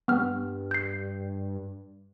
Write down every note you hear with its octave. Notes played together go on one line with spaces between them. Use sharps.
G2 B3 F6
G6 C7